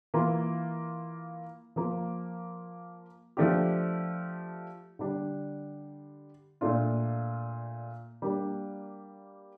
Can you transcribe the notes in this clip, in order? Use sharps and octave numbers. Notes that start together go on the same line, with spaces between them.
E3 A#3 F4
F3 A#3 F4 A#4
F3 A3 D4 G4
D3 G3 D4
A#2 A3 D4 F4
G3 A#3 D4